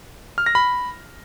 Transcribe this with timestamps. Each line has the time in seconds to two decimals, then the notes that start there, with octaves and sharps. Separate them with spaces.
0.38 F6
0.46 A#6
0.55 B5